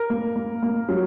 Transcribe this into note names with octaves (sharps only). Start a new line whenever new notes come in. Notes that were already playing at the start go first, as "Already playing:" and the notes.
Already playing: A#4
A#3
A#3
A#3
F#3